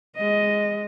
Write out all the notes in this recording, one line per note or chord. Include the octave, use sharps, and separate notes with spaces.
G#3 D#5